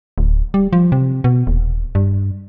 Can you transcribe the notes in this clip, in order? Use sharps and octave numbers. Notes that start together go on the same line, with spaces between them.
D1
G3
F3
C3
B2
D#1
G2